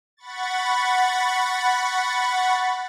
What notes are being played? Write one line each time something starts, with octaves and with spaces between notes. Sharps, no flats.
F#5 B5 C#6 A6